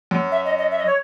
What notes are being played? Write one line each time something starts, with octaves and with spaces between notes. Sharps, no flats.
F#2
E5
D#5
D#5
E5
D#5
C#5